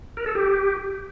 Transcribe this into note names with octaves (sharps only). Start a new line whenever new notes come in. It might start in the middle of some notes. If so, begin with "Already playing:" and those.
A#4
A4
G4